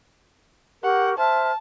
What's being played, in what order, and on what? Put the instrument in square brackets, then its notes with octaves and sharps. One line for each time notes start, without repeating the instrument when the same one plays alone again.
[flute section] G4 A#4 C#6 [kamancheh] F#5
[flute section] C5 E5 F6 [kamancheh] A5